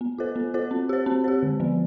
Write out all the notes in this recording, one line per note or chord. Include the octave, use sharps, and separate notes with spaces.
B3
F4 A4 C5
B3
F4 A4 C5
C4
G4 C5
C4
G4 C5
D3
F3 B3